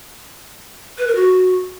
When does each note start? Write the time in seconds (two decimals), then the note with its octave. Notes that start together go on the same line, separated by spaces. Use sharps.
0.98 B4
1.07 A#4
1.16 F#4